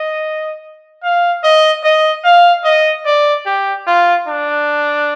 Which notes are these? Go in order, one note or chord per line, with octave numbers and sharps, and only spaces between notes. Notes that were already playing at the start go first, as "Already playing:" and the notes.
Already playing: D#5
F5
D#5
D#5
F5
D#5
D5
G4
F4
D4